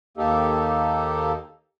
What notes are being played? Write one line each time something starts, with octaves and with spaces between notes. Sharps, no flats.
D#2 A#3 D#4 G4 A4